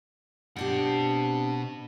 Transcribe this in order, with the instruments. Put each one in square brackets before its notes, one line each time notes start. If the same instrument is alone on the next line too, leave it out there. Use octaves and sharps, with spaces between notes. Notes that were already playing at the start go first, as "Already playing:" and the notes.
[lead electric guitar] B2 F#5 [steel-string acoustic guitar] C4 D4 G4